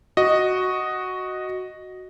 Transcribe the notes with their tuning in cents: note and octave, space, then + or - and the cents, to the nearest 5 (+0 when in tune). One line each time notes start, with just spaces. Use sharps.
F#4 +0 D#5 +0